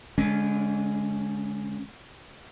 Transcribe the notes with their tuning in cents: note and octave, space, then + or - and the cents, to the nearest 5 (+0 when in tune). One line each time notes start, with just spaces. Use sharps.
D3 -30 G#3 +0 C#4 +0